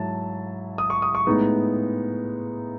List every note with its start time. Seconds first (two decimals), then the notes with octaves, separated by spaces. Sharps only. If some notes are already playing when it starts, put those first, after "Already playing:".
Already playing: G#2 F#3 E4 A5
0.78 D#6
0.90 C#6
1.02 D#6
1.15 C#6
1.27 A2 G#3 B3 D#4